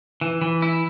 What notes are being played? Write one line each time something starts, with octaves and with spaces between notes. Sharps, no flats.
E3
E3
E4